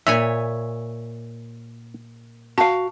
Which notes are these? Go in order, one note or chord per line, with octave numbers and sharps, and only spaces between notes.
A#2 C#5 E5 G#5
F#4 F5 A5